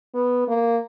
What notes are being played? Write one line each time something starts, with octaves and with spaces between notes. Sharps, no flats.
B3
A#3